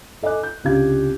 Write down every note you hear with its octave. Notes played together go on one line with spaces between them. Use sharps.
A4 D#5 G#5 D6 F#6
G6
C#2 C3 D4 G4 F5 G#6